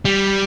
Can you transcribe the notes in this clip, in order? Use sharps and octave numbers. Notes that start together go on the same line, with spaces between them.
G3